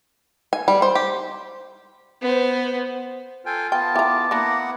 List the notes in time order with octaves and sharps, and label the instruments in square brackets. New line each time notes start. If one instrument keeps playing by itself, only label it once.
[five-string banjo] G#5
G3
C5
G4
[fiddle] B3 C5
[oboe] F4 [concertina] A4 G5 G#5
[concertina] B3 F4 [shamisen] G5 [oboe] A5
[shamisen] E4 A#5 [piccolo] D6
[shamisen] A#3 D4 [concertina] B3 E4 F#5 [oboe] A#5